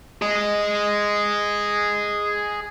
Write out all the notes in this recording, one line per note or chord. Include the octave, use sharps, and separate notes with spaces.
G#4 D#5